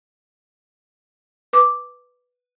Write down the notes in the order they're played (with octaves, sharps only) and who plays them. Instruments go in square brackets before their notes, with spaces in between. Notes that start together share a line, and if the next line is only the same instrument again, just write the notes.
[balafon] B4 D6